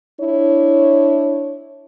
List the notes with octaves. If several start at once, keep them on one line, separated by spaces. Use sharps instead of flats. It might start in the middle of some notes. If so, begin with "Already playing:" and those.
D4 E4 C#5